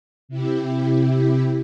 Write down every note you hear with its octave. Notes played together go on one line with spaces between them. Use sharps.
C3 E4 G4